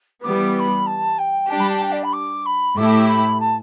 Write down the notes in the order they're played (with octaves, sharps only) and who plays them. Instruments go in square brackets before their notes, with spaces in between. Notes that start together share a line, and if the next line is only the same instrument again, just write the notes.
[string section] E3 G3 B3 [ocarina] D6
[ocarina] D6
B5
A5
G5
[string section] G3 D4 G4 [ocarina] A5
[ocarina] B5
A5
G5
D5
B5
D6
B5
[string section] A2 A3 E4 G4 [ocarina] D6
[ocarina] B5
A5